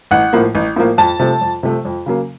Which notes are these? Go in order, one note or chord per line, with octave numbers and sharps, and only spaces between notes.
A1 F#5
A2 F3 A#3
A1
A2 F3 A#3
F2 A5
C3 F3 A3
F2
C3 F3 A3
F2
C#3 F#3 A#3